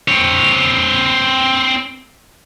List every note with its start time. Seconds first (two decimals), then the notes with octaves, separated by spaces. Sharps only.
0.08 C4 C#5